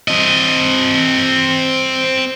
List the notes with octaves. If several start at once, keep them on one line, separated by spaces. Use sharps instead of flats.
C4 D#5